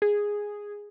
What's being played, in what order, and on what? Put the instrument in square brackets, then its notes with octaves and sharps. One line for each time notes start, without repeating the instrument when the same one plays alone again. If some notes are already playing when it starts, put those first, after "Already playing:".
[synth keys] G#4